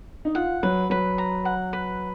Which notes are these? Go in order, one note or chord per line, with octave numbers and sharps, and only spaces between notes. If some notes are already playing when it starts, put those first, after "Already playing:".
D#4
F4 F#5
F#3 B4
F#3 B4
A#5
F#5
B4